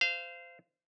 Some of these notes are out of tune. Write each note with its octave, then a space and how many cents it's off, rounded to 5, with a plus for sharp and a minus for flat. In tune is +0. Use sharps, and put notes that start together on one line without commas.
C5 -20 F5 -20